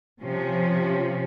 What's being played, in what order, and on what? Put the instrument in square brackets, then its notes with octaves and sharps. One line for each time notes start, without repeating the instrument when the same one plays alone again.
[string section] C3 F3 C#4